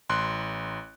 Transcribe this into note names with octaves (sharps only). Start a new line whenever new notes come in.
A1 C6 F#6